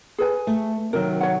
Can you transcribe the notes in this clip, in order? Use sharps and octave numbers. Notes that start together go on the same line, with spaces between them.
G#4 B4 G#5
A3
C3 D#3 F#3 A#4
C#5 F#5